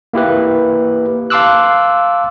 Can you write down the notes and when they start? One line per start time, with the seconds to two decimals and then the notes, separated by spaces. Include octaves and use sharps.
0.13 A#3 E4 G4 B4
1.30 F5 A5 C6 D6 E6 F#6